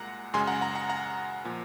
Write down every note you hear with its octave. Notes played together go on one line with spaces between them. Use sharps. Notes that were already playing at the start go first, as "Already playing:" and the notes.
Already playing: C2 A#2 G#3 F#5 A#5
F#2 C#3 G#3 G#5 C6
F#5 A#5
F#5 A#5
F#5 A#5
F#5 A#5
A#2 F3